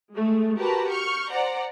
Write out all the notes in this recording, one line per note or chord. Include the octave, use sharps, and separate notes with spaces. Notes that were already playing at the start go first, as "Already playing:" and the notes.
G#3 A3
F#4 G4 A#4 B4 A5 A#5
C#6 F6 G6
C5 D5 F#5 A#5